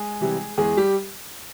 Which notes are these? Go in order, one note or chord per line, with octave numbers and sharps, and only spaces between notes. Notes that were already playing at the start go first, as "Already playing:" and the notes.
Already playing: G#3 G#4
C3 E3 G3
E2 G#3 G#4
G3 G4